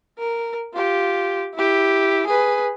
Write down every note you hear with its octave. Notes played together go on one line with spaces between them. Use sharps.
A#4
F4 G4
E4 G4
G#4 B4